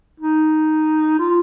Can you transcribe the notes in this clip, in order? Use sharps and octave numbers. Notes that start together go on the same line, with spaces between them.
D#4
F4